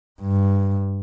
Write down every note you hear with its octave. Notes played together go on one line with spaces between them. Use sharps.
G2